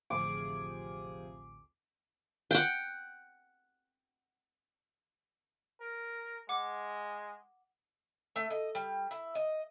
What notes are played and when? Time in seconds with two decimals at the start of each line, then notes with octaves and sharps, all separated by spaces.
0.10 A1 D2 C3 F3 G#4 D6
2.51 F#5 G5
5.81 A#4
6.49 G#3 F#5 D6
8.36 A3
8.50 D#5
8.75 G3
9.11 E4
9.35 D#5